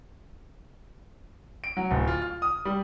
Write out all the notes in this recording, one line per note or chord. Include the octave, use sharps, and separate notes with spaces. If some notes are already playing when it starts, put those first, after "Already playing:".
D7
F#3
D1
F4
F6
D#6
G3